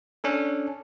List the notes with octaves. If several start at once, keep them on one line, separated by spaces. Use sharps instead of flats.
C#4 D4 A4